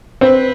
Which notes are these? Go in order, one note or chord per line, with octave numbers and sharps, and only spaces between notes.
C4 B4